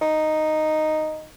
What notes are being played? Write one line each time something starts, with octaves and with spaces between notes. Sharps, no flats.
D#4